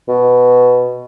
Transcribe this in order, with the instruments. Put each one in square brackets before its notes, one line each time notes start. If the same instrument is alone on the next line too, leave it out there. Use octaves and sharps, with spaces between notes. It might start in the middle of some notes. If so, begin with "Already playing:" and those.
[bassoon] B2